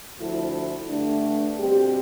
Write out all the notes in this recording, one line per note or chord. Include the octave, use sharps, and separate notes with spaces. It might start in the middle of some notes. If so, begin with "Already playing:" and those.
D2 D3 F3 A3 E4
G2 D3 A3 D4
B2 G3 C4 G4